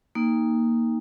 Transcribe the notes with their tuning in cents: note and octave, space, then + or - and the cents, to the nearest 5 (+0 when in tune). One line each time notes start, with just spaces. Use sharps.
A#3 +0 D#4 +0 G5 +25